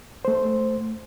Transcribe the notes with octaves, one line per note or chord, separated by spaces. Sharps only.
A3 C5